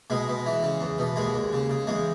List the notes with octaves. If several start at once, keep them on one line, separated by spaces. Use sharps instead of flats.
B2 G#3
B2
E3
C#3
E2
B2
D#2 G#3
D#2
C#3
C#3
E2 G#3